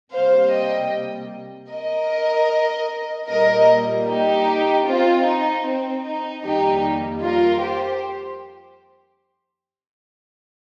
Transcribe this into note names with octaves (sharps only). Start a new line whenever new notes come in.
C3 G3 A#3 C5 F5
D#5 G5
A#4 D#5
A#2 G3 A#3 A#4 D#5
D#4 G4
C4 F4
D#4
C4
D#4
F2 D#3 G3 A#3 D#4 G4
F4 A#4
G4 C5